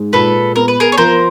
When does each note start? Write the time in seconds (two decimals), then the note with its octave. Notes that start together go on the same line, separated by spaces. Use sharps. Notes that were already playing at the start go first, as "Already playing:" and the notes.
Already playing: G#2 G#3
0.13 A#2 A4 B4
0.56 B3 A#4
0.68 B4
0.80 G#4 A#4
0.92 C#5
0.97 F3 A#4 C5